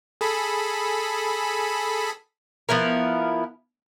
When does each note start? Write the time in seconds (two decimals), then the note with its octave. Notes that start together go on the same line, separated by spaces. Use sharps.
0.21 G#4 A4 B5
2.69 F3 B3 E4 A#4